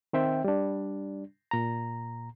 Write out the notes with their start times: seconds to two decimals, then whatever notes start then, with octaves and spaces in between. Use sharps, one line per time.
0.13 D#3 C4 E5 G5
0.44 G3 D4
1.51 A#2 A#5